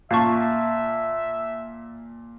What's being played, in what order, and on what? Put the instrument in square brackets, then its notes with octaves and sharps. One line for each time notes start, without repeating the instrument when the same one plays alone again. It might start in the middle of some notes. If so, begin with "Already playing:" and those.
[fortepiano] A#2 A5 [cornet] E5 [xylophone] F5 C#6